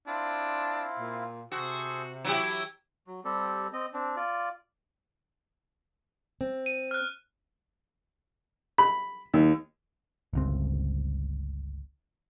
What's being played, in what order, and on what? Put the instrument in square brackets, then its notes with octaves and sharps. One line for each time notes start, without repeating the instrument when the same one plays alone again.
[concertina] C4 E4 F4 [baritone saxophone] D4
[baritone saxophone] A#2
[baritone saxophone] C3 [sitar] F#4 [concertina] G#4 A4 C5
[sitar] F#3 E4 G4 [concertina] A4
[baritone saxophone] E3
[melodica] F#3
G3 C4 G4 A4
C4 D#5
C4 D4
F4 D5
[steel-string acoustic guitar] C4
[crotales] D#7
F6 F#6
[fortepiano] B5
D#2
[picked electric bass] G1 C#2 C4